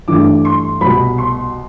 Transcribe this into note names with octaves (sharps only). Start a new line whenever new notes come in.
G2 E3 A3 D4 D6
C6
C2 B2 B3 B5
C6